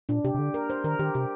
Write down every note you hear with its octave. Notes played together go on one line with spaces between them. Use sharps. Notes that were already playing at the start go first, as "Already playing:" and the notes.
A#2 D4
C3 G4
C3
D3
A#4
C5
D#3 A#4
D#3 G4
C3 G4